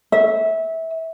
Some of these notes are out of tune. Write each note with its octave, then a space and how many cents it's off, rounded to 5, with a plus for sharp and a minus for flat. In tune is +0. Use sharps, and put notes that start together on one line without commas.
E5 -20